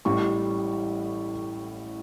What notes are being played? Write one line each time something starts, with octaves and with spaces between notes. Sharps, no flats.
A1 A2 G3 C#6